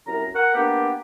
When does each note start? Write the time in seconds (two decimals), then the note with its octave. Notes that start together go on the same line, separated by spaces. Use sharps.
0.07 C2 F#2 A#4 A#5
0.35 A#4 F#5
0.54 A#3 B3 D4 G4